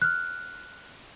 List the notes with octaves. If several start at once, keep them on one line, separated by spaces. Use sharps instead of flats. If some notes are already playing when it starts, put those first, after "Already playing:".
F6 F#6